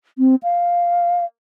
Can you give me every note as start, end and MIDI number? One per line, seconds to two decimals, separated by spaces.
0.18 0.35 60
0.43 1.24 77